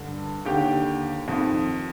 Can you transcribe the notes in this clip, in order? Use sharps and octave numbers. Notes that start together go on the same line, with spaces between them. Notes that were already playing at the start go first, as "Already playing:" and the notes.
Already playing: G2 D3
D#2 D3 G4
F2 D#3